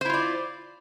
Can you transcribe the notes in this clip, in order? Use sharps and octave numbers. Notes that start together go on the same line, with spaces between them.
E4 F4 C5 D5